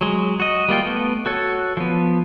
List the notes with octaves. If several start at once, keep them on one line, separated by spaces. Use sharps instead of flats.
F#3 G#3
F#4 D#5
G3 A#3 F4 G5
A3 B3
F#4 A4 C#5
F3 B3